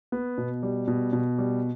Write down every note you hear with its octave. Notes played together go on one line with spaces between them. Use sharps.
B3
B2
G3
B2
B2
G3